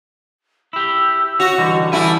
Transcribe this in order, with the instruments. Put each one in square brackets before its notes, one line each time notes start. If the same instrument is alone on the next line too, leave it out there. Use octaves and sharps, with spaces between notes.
[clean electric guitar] E4 G4 [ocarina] E6
[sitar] F#4 [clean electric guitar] C#5
[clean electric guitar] D3 E3 G3 [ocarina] D#5
[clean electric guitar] E3 G3 G#5 [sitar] A3 E4 [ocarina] B5